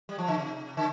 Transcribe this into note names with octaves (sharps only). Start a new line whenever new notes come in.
G3
F3
D3
C3
D3